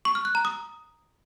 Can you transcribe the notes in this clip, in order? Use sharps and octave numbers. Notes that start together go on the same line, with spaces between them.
C#6
F6
F#6
A#5
D#6